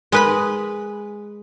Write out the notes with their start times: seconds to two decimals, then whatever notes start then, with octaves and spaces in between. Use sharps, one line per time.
0.12 G#3 B4 B5